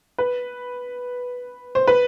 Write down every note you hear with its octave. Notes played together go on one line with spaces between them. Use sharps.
B4
C5
B4